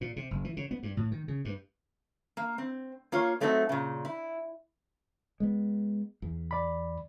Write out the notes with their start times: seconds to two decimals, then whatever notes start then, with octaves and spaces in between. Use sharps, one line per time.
0.01 A#2
0.16 C3
0.31 F#1
0.44 E3
0.57 C#3
0.71 B3
0.83 G2
0.97 A2
1.12 D#3
1.28 C#3
1.45 G2
2.37 A#3
2.58 C4
3.12 A#3 F4 C#5
3.40 F#3 A3 C4 D#4 D5 E5
3.69 A#2 C#3
4.05 E4
5.40 G#3 B3
6.22 E2
6.51 D5 B5